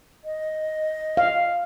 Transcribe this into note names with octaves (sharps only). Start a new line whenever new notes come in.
D#5
F5